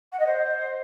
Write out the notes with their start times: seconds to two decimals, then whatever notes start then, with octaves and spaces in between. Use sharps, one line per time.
0.12 F#5
0.20 D#5
0.27 C5